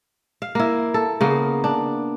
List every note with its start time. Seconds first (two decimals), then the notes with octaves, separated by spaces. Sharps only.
0.42 F5
0.55 A#3 E4
0.94 A4
1.21 C#3 A#3 B3
1.64 D4